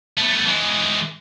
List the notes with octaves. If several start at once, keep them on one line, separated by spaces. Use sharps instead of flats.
A3 B3
E3 G#3